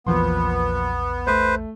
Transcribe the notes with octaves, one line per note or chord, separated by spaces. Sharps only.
A#1 E2 A#2 F3 B3 C6
A3 B4 C5